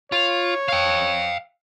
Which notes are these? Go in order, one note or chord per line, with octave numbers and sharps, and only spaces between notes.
F4 C#5
F5 G5